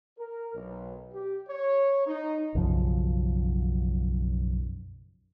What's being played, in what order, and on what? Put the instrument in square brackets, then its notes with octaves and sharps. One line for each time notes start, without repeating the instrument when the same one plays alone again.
[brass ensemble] A#4
B1
G4
C#5
D#4
[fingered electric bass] B1 F#2 C#3 F3